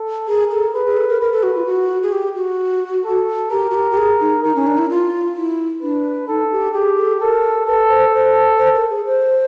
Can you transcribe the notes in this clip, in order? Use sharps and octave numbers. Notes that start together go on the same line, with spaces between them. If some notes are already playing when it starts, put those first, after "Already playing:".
Already playing: A4
G#4 A#4
A4
G#4 B4
G#4
A4
A#4
A#4 B4
A4
F#4
F4
F#4
G#4
G4
F#4
A4
G4 A#4
F#4
G4
G4
G#4
D#4
D#4 A#4
C#4
D4
E4
F4
E4
D4 B4
D#4 A4
G4
G4 G#4
A4
A4 A#4
A4 B4
C5
C5
C5
A#4
G#4
C5